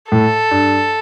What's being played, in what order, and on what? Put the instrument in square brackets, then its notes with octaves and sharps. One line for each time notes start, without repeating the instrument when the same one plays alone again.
[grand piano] A2 [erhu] A4
[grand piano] G2